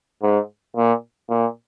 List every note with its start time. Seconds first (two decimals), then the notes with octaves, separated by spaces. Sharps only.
0.22 G#2
0.76 A#2
1.30 A#2